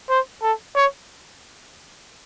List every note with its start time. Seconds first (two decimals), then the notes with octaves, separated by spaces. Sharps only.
0.10 C5
0.42 A4
0.76 C#5